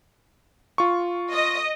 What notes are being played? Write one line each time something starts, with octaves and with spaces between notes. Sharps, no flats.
F4 C#6
D#5